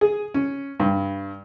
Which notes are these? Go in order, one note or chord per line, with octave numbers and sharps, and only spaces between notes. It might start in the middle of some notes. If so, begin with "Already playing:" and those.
G#4
C#4
G2